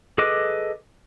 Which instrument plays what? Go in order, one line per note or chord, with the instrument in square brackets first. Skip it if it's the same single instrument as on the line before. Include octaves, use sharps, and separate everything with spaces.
[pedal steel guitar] G#4 A4 B4 D#5 D6